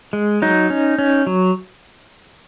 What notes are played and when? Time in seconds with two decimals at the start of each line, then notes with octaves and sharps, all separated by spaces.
0.13 G#3
0.42 F#3 D#4
0.70 C#4
0.98 C#4
1.27 F#3